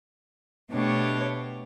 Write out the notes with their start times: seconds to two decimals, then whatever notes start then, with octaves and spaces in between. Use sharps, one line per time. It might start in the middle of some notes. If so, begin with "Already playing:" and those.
0.72 B2 A3 D4 G4 C#5